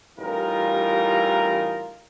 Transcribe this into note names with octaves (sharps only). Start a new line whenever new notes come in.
A1 E3 G3 D#4 F4 A#4